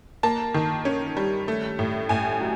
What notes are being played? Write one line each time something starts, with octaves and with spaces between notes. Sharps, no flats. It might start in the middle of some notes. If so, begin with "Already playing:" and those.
A#3 A5
D#3
C#4
G3
A3
A2
A2 G#5
F#3